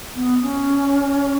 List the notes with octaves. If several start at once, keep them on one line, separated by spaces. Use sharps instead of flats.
B3
C#4